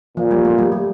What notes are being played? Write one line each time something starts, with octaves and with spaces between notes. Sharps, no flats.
A#2 F3
G3
A3
G3
G3